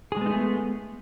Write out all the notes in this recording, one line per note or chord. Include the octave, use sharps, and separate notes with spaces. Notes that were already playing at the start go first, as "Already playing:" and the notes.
G#3 A3 B3 D#4 G#4